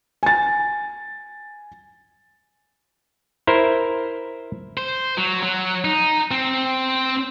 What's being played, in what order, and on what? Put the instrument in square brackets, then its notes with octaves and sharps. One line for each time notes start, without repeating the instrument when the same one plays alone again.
[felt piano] G#5 A6
[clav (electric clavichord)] E4 A#4 C5
[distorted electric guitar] C5
F#3
F#3
D#4
C4